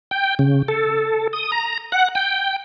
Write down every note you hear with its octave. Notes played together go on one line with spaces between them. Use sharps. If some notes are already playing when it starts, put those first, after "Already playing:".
G5
C#3
A4
D#6
A#5
F#5
G5